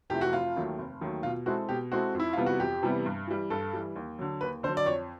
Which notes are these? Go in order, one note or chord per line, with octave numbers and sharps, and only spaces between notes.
F2 C3 E3 A3 G4
F#4
F1 F4
D#2 D#3 F#3 A3
F1
D#2 D#3 F#3 A3
B2 F4
G#3 C4 E4 F#4 A4
B2 G4
G#3 C4 E4 F#4 A4
F2
E4
C3 E3 G3 B3 F4
F#4
F2 G4
C3 E3 G3 B3
G2
E3 G3
G2 A4
E3 G3
D#2
D3 F#3
D#2 B4
D3 F#3 C5
D5
F2 C#5